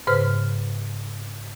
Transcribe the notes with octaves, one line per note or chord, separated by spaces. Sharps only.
G#2 C#3 B4 C5 F6